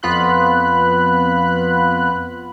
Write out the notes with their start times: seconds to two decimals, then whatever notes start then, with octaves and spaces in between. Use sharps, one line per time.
0.03 F2 B3 F4 B5 F#6